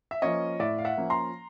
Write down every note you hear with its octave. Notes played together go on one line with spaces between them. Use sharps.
E5
F3 A#3 C#4 C#5 D#5
A2 D5 E5
F5
E5 F#5
F3 A#3 C#4
A#5 C6